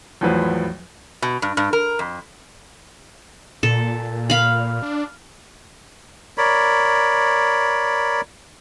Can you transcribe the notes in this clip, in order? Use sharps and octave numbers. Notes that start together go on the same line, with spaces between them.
E2 A2 F3 F#3 B4 C5
B2
G2
G2
A#4
F2
A#2 A4
F5 B5
D4
A#4 C#5 D5 B5